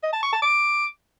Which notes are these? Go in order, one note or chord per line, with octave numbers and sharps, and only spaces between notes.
D#5
A5
C#6
A5
D6